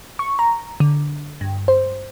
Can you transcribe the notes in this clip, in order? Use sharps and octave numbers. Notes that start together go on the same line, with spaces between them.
C#6
A#5
D3
G2
C5